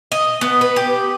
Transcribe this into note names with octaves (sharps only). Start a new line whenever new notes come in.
D#5
B3
B4
G4